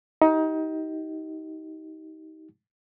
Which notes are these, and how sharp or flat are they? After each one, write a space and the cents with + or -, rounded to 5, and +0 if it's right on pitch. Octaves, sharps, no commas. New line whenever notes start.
D#4 +25 G4 -25